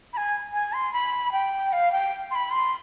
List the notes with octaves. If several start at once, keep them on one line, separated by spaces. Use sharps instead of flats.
B5
G#5
G#5
C6
B5
G5
F5
G5
C6
B5
C6